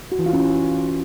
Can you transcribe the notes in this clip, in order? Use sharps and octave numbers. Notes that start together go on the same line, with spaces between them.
F#4
E3
F4
C#4